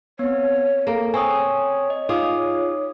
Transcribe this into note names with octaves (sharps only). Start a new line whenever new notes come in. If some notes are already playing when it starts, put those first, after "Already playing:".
B3 C4 C#5
A#3 G#4 A4 A#5
C4 C#5 G#5 C#6 D#6
D#5
D#4 F4 G#4 D6 D#6